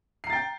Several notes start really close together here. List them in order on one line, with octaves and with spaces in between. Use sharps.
C7 A#5 A6 G5